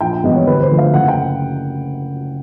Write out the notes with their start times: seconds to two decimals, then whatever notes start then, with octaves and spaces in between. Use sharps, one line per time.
0.01 A#1 G5
0.13 G5
0.24 G#2 E3 G3 B3 D#5
0.36 C#5
0.47 D2 B4
0.62 C5
0.71 D3 F3 A3
0.78 F5
0.94 F#1 F#5
1.08 G5